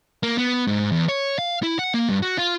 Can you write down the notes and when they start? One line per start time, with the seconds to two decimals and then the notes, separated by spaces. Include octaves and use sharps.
0.23 A#3
0.38 B3
0.67 G#2
0.92 E2
1.09 C#5
1.39 F5
1.63 E4
1.79 F#5
1.94 A#3
2.09 G2
2.22 F#4
2.38 F4